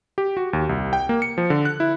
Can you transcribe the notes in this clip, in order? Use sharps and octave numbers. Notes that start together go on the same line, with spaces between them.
G4
F#4
D#2
C2
G5
A#3
C#7
F3
D3
F#6
E4